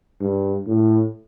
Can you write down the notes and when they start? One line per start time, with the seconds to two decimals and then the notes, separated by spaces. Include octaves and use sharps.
0.20 G2
0.67 A2